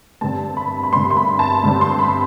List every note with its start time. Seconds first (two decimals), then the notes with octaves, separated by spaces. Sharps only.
0.21 G2 D3 G3 C4 A5
0.57 B5
0.83 B5
0.92 G2 D3 G3 C4 C6
1.10 C6
1.17 B5
1.39 A5
1.63 G2 D3 G3 C4
1.81 C6
1.99 B5